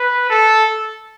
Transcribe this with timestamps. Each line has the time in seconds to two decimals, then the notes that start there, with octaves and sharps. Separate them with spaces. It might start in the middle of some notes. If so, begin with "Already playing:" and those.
Already playing: B4
0.30 A4